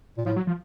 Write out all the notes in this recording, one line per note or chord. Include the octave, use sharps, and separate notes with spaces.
A#2
A2 F3
F#3
F3